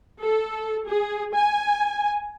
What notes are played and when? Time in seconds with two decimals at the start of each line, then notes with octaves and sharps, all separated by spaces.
0.22 A4
0.88 G#4
1.36 G#5